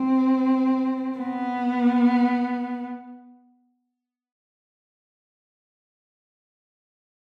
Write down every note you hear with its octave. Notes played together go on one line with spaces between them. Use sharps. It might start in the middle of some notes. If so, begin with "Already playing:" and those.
Already playing: C4
B3